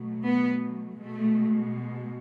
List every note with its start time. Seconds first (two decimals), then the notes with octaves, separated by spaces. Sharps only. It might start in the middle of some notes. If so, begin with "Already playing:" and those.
Already playing: B2 F#3 A3
0.27 B3
1.02 B2 G#3 A3